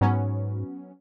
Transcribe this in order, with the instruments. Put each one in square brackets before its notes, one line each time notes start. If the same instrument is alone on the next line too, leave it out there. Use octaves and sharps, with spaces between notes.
[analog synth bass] G#2 [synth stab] F#3 B3 C#4